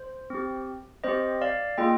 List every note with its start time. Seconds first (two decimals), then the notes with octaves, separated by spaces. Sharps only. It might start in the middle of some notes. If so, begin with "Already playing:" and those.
Already playing: C5
0.30 C4 G4
1.04 C4 G4 C5 D#5
1.41 D5 F5
1.78 A#3 F4 G#4 D#5 G5